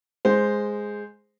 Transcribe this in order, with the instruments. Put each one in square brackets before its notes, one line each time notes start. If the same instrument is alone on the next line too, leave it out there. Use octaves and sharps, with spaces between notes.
[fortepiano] G#3 C5